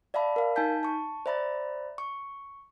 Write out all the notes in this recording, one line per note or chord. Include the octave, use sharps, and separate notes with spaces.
D5 E5 F5 A5 B5
A#4 F5
D#4 G#5 A5 G6 B6
A5 C#6
C5 D5 E5 A#5 B5 A6
C#6